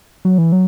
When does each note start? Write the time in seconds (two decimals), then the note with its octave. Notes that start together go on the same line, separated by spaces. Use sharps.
0.25 F#3
0.38 E3
0.52 F#3